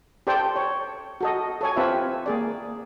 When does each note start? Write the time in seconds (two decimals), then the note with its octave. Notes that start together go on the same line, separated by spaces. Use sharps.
0.27 G4 A4 C5 D5 G5 A5
0.56 C#5
1.21 F#4 A4 D#5
1.61 A4 C#5 G#5
1.76 C4 F4 G4 B4 E5
2.26 A#3 G#4 D5